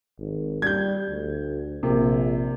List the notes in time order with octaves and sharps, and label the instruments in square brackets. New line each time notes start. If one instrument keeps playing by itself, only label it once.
[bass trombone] G#1
[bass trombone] G3 [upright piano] G6 G#6
[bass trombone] D2
[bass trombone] A#1 [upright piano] C3 A#3